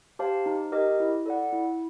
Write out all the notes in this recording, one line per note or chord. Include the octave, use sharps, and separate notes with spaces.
G4 C5 F5 A5
D#4
G4 A#4 D#5
E4
A4 D5 F#5
E4